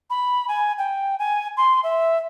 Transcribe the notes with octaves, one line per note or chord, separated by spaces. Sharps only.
B5
G#5
G5
G#5
C6
E5